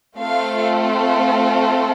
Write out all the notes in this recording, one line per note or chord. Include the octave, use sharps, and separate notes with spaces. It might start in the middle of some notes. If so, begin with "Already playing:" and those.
A3 C4 F4 A4 F5